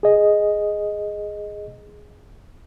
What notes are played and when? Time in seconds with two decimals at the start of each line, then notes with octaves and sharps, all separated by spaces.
0.03 G#4 D#5